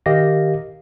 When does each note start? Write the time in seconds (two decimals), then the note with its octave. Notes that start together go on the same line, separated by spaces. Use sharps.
0.06 D#3 G4 A#4 D#5 F5 A#6